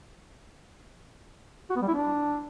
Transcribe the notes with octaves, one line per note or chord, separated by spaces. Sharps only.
F#4
B3
G3
E4
D4